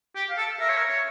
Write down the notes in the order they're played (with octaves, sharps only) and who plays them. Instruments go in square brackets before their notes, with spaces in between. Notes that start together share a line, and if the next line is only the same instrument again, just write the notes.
[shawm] G4
[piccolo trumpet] F5
[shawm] A4
[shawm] A#4 [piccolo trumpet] E5
[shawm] C#5
A#4
C#5